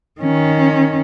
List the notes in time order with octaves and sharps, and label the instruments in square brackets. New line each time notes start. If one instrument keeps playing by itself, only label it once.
[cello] D#3 C#4